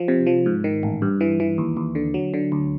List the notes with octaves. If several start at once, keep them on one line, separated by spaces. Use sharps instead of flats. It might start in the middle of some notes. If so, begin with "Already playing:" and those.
Already playing: F3
C3
F3
G#2
D#3
A1
G2
E3
E3
D#2
D#2
D3
F#3
D3
D2